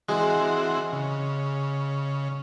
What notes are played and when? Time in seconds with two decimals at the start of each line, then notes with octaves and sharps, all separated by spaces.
0.09 E3 G#3 C4 F#4
0.93 C#3